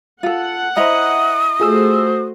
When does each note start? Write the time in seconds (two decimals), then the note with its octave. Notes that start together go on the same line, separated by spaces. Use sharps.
0.23 F4 A4 F#5
0.77 E4 C5 D#5 E5 A#5 D#6
1.60 A3 F4 F#4 G#4 C5 E6